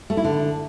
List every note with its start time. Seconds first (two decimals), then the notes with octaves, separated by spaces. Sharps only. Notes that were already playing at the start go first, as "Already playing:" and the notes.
0.10 A3
0.17 E4
0.25 D3